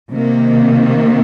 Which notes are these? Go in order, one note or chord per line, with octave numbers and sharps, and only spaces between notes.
C3 D#3 A#3